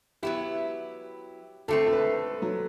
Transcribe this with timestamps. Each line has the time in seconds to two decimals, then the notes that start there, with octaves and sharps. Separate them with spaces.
0.23 F#3 B3 E4 G4
1.68 D3 A3 C4 A4
1.87 A4
1.93 B4
2.42 F#3